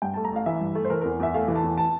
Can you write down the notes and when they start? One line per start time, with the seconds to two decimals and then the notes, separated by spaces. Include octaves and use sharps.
0.02 G2 G5
0.14 A3 A5
0.25 A#5
0.32 A1 F5
0.46 E3 E5
0.60 G2
0.75 A3
0.85 C5
0.90 E3 A#4
1.01 E2 A#4
1.20 E2 E5
1.34 A3 F5
1.48 E3
1.56 A5
1.63 E2
1.78 A5